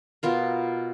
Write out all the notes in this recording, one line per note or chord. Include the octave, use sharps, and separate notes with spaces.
B2 B3 F4 A#4